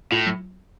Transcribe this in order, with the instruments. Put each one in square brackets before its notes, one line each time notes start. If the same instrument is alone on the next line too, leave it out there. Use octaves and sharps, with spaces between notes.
[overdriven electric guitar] A2 [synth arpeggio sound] F4
[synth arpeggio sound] F#3